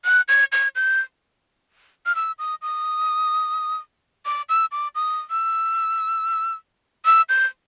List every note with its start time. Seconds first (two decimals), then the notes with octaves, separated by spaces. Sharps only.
0.05 F#6
0.28 G#6
0.52 G#6
0.76 G6
2.06 F6
2.16 E6
2.39 D#6
2.62 D#6
4.26 D6
4.49 E6
4.72 D6
4.95 D#6
5.30 E6
7.05 E6
7.29 G6